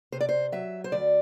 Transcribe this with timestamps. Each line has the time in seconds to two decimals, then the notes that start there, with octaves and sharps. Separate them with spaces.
0.12 C3 C5
0.21 D5
0.29 C5
0.52 F#3 E5
0.84 C5
0.92 D2 D5